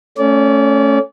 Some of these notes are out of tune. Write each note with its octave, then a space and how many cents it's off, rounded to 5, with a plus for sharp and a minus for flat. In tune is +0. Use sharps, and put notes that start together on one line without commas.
A3 +0 C#4 +0 D5 -30